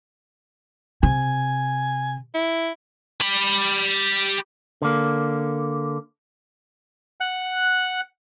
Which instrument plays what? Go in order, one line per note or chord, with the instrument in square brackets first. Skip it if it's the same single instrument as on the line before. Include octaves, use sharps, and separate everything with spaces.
[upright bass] C3 [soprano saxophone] G#5
[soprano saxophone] E4
[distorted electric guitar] G4 B5
[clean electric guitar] D3 A#3
[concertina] F#5 F#6